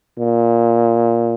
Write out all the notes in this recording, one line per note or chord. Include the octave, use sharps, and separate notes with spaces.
A#2